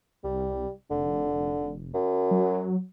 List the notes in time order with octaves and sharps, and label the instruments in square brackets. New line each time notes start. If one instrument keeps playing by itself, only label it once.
[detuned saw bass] C2 [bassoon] G3
[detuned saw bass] F1 [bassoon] D3
[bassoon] F#2
[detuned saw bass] F#3